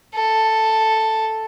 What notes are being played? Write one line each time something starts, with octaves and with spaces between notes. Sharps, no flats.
A4